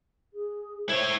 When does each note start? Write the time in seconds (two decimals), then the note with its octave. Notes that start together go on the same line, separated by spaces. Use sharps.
0.34 G#4
0.89 E4 C5 C#5